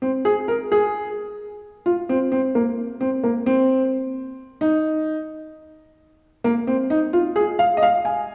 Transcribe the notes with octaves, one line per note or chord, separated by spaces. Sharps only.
C4
G#4
A#4
G#4
F4
C4
C4
A#3
C4
A#3
C4
D#4
A#3
C4
D#4
F4
G#4
F5
D#5
F5
G#5